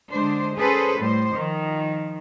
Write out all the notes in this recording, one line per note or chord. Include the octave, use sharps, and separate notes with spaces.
D3 G#3 D4 C5
C#4 G#4 A4 B4 C5
A2 G3 C5
D#3 F3